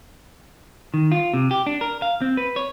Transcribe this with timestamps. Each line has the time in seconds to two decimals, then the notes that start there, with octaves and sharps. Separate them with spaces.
0.94 D#3
1.12 F4
1.34 C3
1.51 G4
1.66 D4
1.81 A#4
2.02 F5
2.22 C4
2.37 B4
2.56 C#5